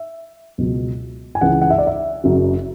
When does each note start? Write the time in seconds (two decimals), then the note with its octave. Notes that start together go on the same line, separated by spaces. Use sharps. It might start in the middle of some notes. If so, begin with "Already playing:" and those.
Already playing: E5
0.58 C#2 B2 F#3
1.35 G#5
1.41 C#2 C#3 E3 F#5
1.62 F#5
1.70 E5
1.78 D5
1.87 E5
2.24 F#1 F#2 C#3 F#3